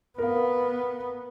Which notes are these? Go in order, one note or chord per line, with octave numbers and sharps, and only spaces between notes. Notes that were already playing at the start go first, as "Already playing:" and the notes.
B3 A#4 F5